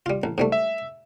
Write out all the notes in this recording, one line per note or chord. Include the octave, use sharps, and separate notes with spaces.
G3 F4
A1
G#2 G3 A3
E5